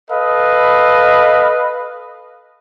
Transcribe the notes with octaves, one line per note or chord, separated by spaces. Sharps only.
A4 B4 D#5 F5